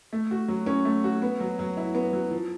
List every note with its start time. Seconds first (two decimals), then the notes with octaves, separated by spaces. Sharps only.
0.13 A3
0.31 F#4
0.48 F#3
0.66 C#4
0.85 A3
1.04 F#4
1.22 B3
1.41 F#3
1.59 F#3
1.77 E4
1.95 B3
2.13 F#3
2.31 F3